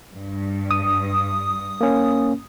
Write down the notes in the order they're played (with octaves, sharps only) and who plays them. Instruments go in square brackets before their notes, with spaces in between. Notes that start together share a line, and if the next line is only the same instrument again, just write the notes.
[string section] G2
[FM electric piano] D#6
[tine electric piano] A#3 C#4